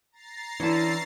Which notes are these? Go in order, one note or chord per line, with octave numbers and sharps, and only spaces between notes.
A#5 A6 C7
D3 E3 C#4 E4